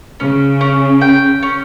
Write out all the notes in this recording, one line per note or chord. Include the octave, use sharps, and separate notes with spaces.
C#3 C#4
C#4
G5
C#4